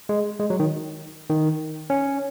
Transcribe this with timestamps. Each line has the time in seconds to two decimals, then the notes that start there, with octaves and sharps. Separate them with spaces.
0.09 G#3
0.40 G#3
0.50 F#3
0.60 D#3
1.30 D#3
1.90 C#4